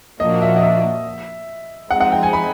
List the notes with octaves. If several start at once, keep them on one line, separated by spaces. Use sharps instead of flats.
A#2 F3 A#3 D4 F#4 D#5
E5
D#5
E5
F3 G#3 C4 D#4 F#5
F#5
G5
G#5
B5